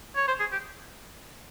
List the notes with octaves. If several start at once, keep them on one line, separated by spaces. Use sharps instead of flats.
C#5
C5
G#4
G4